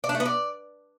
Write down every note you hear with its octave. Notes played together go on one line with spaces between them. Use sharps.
D5
D4
A3
B3
D5